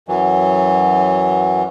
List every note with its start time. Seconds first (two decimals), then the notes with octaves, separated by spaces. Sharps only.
0.08 F#2 E3 F#3